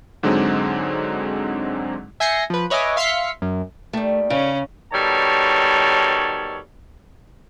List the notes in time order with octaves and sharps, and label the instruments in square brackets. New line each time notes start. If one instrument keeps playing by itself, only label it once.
[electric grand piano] G#2 D3 F#3 G#3 C4 D#4
[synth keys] E5 G#5 G6 A#6 C7 C#7
F3 B4
B4 C#5 D#5 E5 G#5 D6
E5 F5 C6 F6 B6 C#7
F#2
[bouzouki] D#3 G3 [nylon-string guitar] A3
[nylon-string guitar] C#3 [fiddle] C#4
[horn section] B2 D#3 G3 A4 C#5 A5